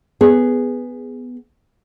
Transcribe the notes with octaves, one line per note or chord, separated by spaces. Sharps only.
B3 G#4